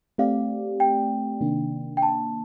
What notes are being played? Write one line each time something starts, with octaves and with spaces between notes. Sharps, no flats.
A3 C4 G4 D5 F5
G5
C3 D#3 A#3 D4
G5
A5